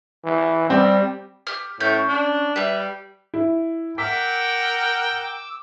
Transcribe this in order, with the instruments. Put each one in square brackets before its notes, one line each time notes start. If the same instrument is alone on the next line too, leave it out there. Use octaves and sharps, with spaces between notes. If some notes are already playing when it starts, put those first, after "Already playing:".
[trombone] E3
[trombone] G3 [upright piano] C4
[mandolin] G4 F6
[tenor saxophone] A2 [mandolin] C#4 G6
[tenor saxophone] D4
[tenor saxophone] G3 [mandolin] B4 E5
[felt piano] E4
[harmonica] A#4 F#5 G5 [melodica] D6 E6 [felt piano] B6